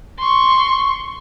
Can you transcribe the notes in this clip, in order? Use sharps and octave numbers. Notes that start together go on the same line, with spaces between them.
C6 C#6